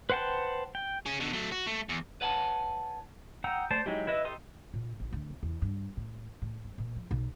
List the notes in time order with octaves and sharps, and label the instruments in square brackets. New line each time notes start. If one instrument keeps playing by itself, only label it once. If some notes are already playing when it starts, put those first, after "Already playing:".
[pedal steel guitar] B4 C5 F#5 G5 A5
G5
[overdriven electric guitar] C#4 G#4
B2 D3
F#3 A3
F#4
A3
E2
[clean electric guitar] B4 C#5 F#5 G#5 A5
[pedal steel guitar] F#5 G5 A#5 D#6 E6
A3 C5 D5 A5
F#3 G#3 D#4 E4 G4
E4 B4 D#5 E5
D#4 G4 A4 C6 D#6
[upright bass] A#2
A1
D2
B3
E2
G2
A2
A2
G2
A#2
F3
B1